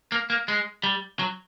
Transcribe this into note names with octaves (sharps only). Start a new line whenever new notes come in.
A#3
A#3
G#3
G3
F#3